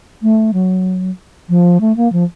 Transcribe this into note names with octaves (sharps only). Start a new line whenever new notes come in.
A3
F#3
F3
A3
A#3
F3